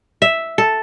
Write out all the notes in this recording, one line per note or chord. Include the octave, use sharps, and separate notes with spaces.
E5
A4